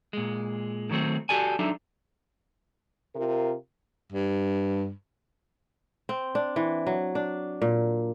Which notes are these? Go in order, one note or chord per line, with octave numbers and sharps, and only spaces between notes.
A#2 G#3
D3 D#3 F#3 A3 C4
F#4 G4 A4 D5 G#5
F#3 D4 D#4 A4 E5
C3 F4 A#4
G2
C4
D4
E3
F#3
D4
A#2